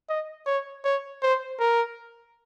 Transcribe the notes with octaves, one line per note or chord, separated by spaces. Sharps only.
D#5
C#5
C#5
C5
A#4